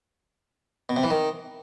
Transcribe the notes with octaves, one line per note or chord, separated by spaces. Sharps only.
B2
C3
E3
D#3